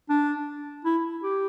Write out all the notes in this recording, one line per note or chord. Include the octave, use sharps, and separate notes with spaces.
D4
E4
G4